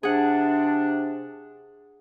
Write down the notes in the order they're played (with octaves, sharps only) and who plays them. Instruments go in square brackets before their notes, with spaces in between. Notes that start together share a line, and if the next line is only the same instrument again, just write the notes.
[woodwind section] C3 D4 [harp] G#4 F#5